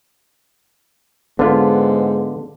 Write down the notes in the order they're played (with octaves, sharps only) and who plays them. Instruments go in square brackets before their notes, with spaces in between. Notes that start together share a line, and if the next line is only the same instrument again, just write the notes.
[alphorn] G#2 [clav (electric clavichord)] D3 F4 [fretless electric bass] B3